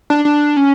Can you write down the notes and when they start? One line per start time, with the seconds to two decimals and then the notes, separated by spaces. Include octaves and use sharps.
0.10 D4
0.25 D4
0.57 C#4